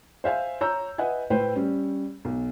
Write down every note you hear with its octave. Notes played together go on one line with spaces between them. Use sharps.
C5 E5 F5 G#5
C#5 A#5 E6 G6
B4 D#5 E5 F#5 G#5
A2 B4 C5 G5
G3 C#4
B1